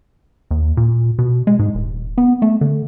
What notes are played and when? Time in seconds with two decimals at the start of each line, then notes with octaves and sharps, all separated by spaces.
0.51 D#2
0.77 A#2
1.19 B2
1.47 G#3
1.59 G#2
1.75 D#1
2.18 B3
2.42 A3
2.61 D3